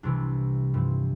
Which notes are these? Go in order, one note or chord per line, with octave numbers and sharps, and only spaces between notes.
C2 C3 E3 D4
G2 F3 C4